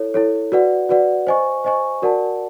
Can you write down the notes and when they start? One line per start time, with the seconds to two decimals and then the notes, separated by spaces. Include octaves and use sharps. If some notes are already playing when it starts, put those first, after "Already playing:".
Already playing: E4 A4 C#5
0.14 E4 A4 C#5
0.52 F#4 B4 D5 F#5
0.89 F#4 B4 D5 F#5
1.27 C5 D#5 G#5 C#6
1.64 C5 D#5 G#5 C#6
2.02 F#4 A#4 D5 F#5 A5